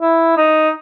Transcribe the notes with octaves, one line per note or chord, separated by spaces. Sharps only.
E4
D#4